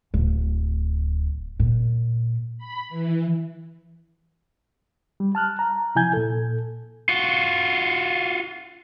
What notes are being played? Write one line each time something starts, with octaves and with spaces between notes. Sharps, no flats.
D1
A#2
B5
E3
G3
A5 F6 F#6
A#5
C3 F3 E4 G#5 G6 G#6
A#2 A4
F4 F#4